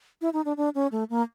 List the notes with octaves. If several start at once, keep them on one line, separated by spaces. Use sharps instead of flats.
E4
D#4
D4
D4
C#4
A3
A#3